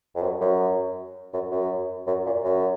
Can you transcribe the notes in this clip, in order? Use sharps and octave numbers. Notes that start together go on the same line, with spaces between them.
F2
F#2
F#2
F#2
F#2
F#2
A#2
F#2